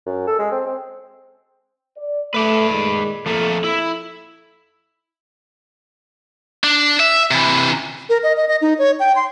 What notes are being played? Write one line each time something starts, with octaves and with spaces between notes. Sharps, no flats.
F#2
A4
G#3
C4
C4
D5
A3 B4 D5
A#2 D#3 G#3
F2 F3 A3 A#3 A4
E4
D4
E5
C3 E3
A#4
D#5
D#5
D#5
D#4
C#5
G5
C6